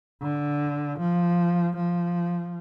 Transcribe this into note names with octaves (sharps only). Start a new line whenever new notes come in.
D3
F3
F3